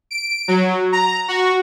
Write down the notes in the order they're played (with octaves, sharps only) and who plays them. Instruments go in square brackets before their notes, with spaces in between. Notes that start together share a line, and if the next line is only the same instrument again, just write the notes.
[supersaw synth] D7
F#3
A#5
F#4